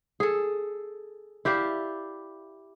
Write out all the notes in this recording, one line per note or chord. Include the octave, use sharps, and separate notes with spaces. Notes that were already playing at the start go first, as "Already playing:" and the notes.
G#4 A4
E4 G4 D5 F5